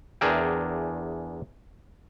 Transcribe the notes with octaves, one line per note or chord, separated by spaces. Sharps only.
E2 D4 G#4 A#4 E5 G5